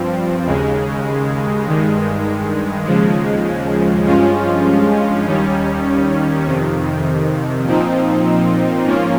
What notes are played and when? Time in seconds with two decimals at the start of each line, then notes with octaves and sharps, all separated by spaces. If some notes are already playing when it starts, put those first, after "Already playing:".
Already playing: G2 F3 C4
0.46 D#2 C#3 G#3
1.65 G2 D#3 G#3
2.85 D#2 C#3 F3 G#3
4.05 G2 F3 G#3 C#4 F4
5.25 D#2 D#3 G3 C#4
6.45 F2 C3 D#3
7.65 A#2 F3 C4 D#4
8.84 G#2 F3 A#3 C#4 F4